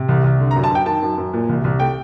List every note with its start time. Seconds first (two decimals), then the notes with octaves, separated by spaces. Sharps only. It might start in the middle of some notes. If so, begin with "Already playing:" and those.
Already playing: C3
0.09 C2
0.24 C2
0.40 D3
0.51 A#5
0.56 F#2
0.64 A5
0.71 F#2 G5
0.86 D#3 A5
1.02 F#2
1.18 F#2
1.33 A#2
1.49 C2
1.64 C2
1.80 A3 G5